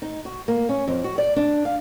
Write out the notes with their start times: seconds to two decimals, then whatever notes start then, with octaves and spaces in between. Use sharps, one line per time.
0.02 D#4
0.25 F#4
0.48 A#3
0.69 C#4
0.88 F2
1.04 F#4
1.18 D5
1.36 D4
1.65 F5